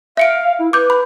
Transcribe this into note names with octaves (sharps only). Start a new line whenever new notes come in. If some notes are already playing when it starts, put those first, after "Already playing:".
E5 F5 C#7 D7
E4
B4 D6 G6
B5